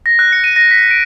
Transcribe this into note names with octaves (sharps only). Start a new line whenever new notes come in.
A#6
F#6
C#7
D#7
A#6
B6
D7